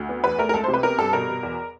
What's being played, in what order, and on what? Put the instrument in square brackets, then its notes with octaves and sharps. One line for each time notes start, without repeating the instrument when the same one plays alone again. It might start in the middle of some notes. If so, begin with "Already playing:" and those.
Already playing: [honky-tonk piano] D2
B3
E2 B4
A3 A#4
A#4
C#2 A4
C5
C3
B4
B3 A#4
G2 A4
B2 A#4
B2
E2